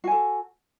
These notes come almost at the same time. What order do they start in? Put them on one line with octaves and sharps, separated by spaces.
F#4 G#5 A4